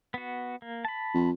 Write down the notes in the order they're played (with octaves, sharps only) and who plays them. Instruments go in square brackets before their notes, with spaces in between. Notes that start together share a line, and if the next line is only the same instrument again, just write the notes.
[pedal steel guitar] B3 F#4
A#3
A5 B5
[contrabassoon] F2